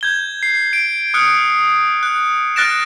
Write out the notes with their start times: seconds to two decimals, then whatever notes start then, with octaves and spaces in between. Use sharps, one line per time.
0.01 G6 G#6 G7
0.43 C7
0.73 D7
1.14 D#6 F6 F#6 C#7
2.03 F#6
2.56 F6 F#6 A6 A#6 D7 E7